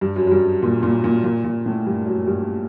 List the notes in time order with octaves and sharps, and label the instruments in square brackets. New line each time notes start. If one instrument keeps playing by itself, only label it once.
[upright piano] G2
F#2
F#2
G2
A#2
A#2
A#2
A#2
A#2
A2
G2
F#2
G2